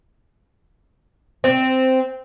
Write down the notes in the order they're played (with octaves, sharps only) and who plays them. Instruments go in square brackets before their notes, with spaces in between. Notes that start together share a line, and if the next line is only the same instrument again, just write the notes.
[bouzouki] C4